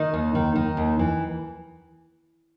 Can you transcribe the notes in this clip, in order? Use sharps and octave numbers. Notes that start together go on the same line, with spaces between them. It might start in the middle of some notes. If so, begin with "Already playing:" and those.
Already playing: D#3 D#4
D#2
D#3
D#3
D#2
E3